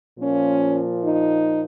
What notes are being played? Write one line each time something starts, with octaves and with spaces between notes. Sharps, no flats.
A#2 F3 A#3 C#4
D#4